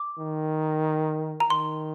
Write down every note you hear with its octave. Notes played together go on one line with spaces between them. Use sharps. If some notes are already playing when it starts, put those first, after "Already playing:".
Already playing: D6
D#3
A#5
D#3 C6